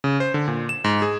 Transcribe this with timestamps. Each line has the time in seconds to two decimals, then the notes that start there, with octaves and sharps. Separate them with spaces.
0.04 C#3
0.20 C5
0.34 D3
0.48 A#2
0.69 E7
0.84 G#2
1.02 G#4